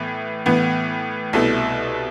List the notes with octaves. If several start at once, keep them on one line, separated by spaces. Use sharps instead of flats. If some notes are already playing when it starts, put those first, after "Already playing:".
Already playing: A2 E3 B3
A2 E3 B3
C2 B2 A3 E4